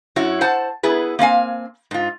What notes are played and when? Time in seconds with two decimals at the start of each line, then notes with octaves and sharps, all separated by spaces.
0.16 F#2 E4 F#4 C#5
0.41 C5 F#5 A5
0.83 B3 E4 G#4 B4
1.19 A#3 C4 F5 G#5
1.91 G#2 F4